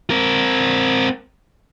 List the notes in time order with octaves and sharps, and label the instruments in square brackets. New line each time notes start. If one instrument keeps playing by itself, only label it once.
[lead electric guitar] C4 A#4